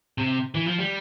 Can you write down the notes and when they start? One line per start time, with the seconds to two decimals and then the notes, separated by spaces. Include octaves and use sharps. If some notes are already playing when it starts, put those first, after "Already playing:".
0.18 C3
0.55 E3
0.66 F3
0.79 G3